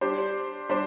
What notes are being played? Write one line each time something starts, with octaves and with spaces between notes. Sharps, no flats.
G3 D4 G4 C5
G3 D4 G4 C5